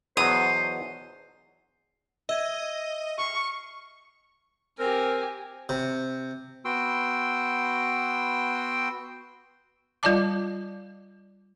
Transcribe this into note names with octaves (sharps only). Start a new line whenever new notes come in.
E2 B2 F#3 C5 D#6
D#5 E5 G#6
C#6 F6 C7
C4 G4 A#4 G#5
C3
B3 F#4 G5 C6 E6
G3 F4 D5 D#5 A5 D6